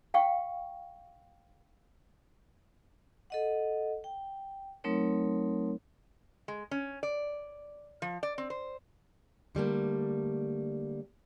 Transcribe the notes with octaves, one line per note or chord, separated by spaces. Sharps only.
F5 G5 C#6
A4 D#5 F#5
G5
F#3 A3 C4 D#4 A#4 C#5
G#3
C#4
D5
F3
D5
C4
C5
D3 G3 A3 A#3